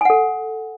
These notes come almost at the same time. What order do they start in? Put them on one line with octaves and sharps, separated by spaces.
G#5 F#5 A4